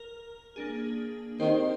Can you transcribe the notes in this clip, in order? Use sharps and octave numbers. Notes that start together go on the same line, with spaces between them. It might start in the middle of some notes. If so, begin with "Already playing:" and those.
Already playing: A#4
A#3 D4 G#4
D#3 C4 G4 C5